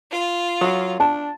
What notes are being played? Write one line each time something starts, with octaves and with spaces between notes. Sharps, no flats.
F4
F#3
D4 A5